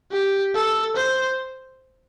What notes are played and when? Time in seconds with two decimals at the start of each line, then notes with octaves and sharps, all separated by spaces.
0.12 G4
0.54 A4
0.96 C5